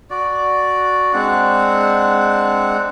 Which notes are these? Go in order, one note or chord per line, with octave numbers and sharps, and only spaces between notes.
F#4 D5
G#3 C4 D4 F#5